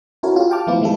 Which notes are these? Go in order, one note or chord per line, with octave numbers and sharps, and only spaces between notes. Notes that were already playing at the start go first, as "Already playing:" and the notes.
C#4 E4 F#4 A4 A#4 C#5
F4 G4
F5 G5 A5 D6 F6
F3 A3 B3 E4 F4
D#3 F3 G#3 E4 G4 A4